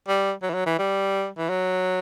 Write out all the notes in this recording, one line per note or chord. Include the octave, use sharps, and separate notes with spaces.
G3
F#3
E3
F#3
E3
G3
E3
F#3